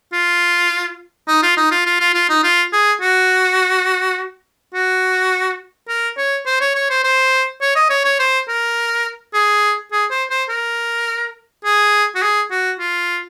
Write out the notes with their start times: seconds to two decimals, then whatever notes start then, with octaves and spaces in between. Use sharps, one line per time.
0.13 F4
1.28 D#4
1.43 F4
1.57 D#4
1.71 F4
1.86 F4
2.00 F4
2.14 F4
2.29 D#4
2.43 F4
2.73 G#4
3.01 F#4
4.74 F#4
5.88 A#4
6.17 C#5
6.46 C5
6.61 C#5
6.75 C#5
6.90 C5
7.04 C5
7.61 C#5
7.75 D#5
7.90 C#5
8.05 C#5
8.19 C5
8.48 A#4
9.34 G#4
9.92 G#4
10.11 C5
10.31 C5
10.49 A#4
11.65 G#4
12.15 F#4
12.22 G#4
12.51 F#4
12.80 F4